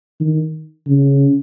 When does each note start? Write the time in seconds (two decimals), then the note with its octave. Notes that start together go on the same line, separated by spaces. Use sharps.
0.20 D#3
0.87 C#3